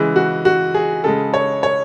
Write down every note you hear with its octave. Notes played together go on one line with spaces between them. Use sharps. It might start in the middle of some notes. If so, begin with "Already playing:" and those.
Already playing: C#3 E3 G#3
F#4
F#4
G#4
C#3 G#3 A4
C#5
C#5